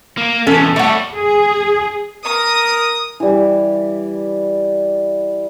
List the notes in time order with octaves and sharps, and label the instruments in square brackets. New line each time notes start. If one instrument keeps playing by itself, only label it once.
[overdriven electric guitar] A#3
[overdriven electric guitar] E2 B2 [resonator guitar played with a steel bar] C#4 [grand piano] A4
[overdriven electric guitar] G3 C#5 [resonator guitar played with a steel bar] A3 F#5
[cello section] G#4
[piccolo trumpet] A#4 [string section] D#6
[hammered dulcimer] E3 G3